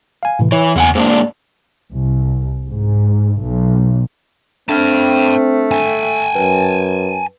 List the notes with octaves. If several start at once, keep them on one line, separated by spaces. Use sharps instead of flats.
F5 G#5
A2 C3 E3
E3 C#5
E2 C#3 F#5 G#5
G#2 A#3 D4 C5
D5
C2
G#2
B1
A3 C4 D4 G5 A5 F6
G#5 A5
F#2 B4